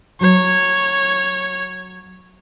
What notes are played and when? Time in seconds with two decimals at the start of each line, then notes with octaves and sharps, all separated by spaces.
0.21 F#3 C#5